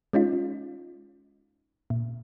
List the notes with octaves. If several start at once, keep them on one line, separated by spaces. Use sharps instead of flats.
G#3 C#4 D#4 F4
A#2